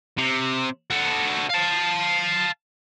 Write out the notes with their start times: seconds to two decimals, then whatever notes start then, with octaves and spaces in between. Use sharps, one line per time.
0.18 C3
0.90 F#4 A4
1.50 F5 A5